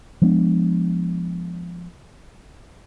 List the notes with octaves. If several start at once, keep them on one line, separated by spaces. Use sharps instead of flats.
F3 G#3 B3 D4